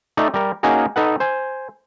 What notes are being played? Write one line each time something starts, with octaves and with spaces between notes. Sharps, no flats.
A3 D#4 D5
G3 A#4
A#3 C#4 D#4 F#4 G#4 A#4
D#4 A4 B4 F#5
C5 G#5